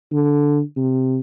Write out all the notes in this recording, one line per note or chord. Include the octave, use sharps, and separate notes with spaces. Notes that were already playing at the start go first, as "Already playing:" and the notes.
D3
C3